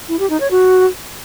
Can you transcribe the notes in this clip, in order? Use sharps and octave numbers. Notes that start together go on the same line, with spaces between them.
E4
G4
D#4
C#5
F#4